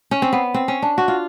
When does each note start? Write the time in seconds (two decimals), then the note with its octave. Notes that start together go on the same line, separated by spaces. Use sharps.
0.11 C#4
0.22 C4
0.33 B3
0.54 C4
0.68 C#4
0.82 D4
0.98 F#4
1.08 F4